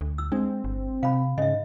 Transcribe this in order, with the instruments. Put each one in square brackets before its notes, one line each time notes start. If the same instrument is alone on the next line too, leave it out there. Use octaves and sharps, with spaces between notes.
[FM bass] D2
[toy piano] E6
[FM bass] G#3 [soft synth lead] C4 [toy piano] D4
[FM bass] G1
[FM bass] C3 [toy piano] F5 B5
[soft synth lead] G#2 [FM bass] C#3 [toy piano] D#5 E5